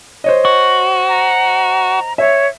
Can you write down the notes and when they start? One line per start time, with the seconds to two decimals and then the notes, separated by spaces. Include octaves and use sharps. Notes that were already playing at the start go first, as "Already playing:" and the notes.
0.24 C5 C#5 D#5
0.45 F#4
1.09 A#5
2.18 C#5 E5